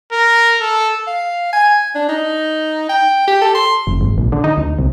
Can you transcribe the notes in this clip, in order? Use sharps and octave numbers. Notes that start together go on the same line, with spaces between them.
A#4
A4
F5
G#5
D4
D#4
G5
G4
A4
C6
F#1
G#1
A#1
D3
D#4
D2
C2